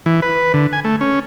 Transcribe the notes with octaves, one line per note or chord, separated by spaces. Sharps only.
E3
B4
D3
G#5
A3
C#4